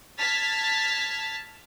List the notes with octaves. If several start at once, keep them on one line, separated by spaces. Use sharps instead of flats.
A5 F6 G#6 A6 B6